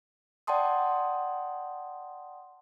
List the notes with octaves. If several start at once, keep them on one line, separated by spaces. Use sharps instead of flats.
D5 F#5 G5 A5 C6 D#6